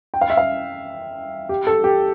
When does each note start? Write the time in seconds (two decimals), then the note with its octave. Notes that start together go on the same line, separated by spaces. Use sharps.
0.14 G5
0.21 F5
0.30 E5
0.37 F5
1.49 G4
1.67 A4
1.84 G4